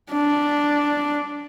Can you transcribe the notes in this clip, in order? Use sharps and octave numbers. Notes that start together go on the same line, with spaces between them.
D4